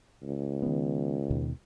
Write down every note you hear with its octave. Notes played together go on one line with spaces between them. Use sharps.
C#2
D#3 B3
D#2 B2 D#3